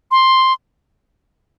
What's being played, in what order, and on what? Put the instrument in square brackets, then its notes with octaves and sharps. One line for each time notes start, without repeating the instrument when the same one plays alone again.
[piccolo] C6